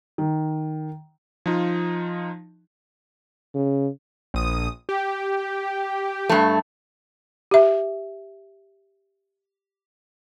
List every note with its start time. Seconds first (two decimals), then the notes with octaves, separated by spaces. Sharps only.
0.18 D#3
1.46 F3 D#4 F4
3.55 C#3
4.34 A#1 D#6
4.89 G4
6.30 G2 A3
7.51 G4 E5